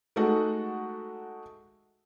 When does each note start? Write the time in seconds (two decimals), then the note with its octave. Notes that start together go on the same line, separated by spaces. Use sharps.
0.16 G#3 A3 D#4 F#4 A4 F#5